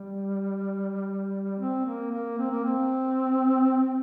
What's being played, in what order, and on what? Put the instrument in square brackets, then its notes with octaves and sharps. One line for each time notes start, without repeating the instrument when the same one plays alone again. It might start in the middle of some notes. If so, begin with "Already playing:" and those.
Already playing: [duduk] G3
C4
A#3
A#3
C4
A#3
C4